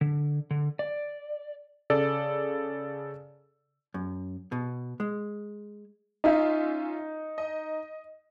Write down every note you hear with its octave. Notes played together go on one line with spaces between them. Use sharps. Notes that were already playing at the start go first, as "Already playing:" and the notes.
D3
D3
D5
C#3 A4 D5
F#2
B2
G#3
C#4 D#4 F4 E5
D#5